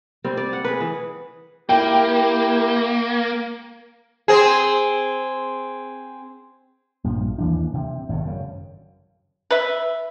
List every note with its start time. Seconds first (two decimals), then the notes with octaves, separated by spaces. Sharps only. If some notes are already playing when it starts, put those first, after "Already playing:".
0.24 G3 C4
0.37 D5
0.53 F#5
0.65 G#4 B4
0.81 E3
1.69 A#3 E4 G4 G5
4.28 C4 G#4
7.04 A#1 G2 F3
7.38 D#2 E3 D4
7.74 C3 C4
8.09 G#1 G2 B2
8.25 F#2 C#3
9.51 B4 E5